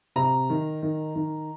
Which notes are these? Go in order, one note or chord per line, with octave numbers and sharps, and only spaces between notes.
C3 A#5
D#3
D#3
D#3